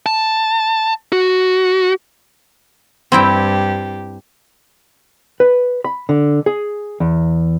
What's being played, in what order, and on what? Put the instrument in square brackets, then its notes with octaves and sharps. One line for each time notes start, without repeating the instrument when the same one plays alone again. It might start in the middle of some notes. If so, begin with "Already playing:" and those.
[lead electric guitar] A5
F#4
[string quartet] G2 G4 [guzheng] C4 E4 G5
[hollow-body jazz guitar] B4
B5
D3
G#4
E2